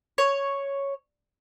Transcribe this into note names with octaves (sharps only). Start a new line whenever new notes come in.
C#5